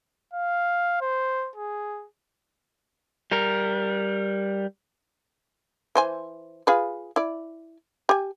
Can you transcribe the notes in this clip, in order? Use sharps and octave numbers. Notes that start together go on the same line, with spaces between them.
F5
C5
G#4
G3 A#4
E3 C5 G#5
F4 G#4 B4
E4 D5
G4 G#5